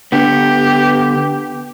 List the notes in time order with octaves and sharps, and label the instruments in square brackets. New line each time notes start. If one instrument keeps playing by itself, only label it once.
[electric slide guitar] D3 B3 [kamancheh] G4